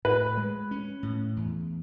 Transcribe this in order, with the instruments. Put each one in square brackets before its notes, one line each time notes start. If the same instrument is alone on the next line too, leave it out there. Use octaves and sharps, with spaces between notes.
[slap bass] A2 [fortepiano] B4
[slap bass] G#3
C#4
A2
E2